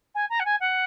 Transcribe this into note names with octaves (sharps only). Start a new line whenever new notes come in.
G#5
A#5
F#5
G#5
F#5